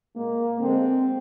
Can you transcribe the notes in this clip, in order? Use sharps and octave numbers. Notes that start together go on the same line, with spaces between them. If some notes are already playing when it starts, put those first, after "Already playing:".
A#2 G#3 A#3
D3 G#3 C4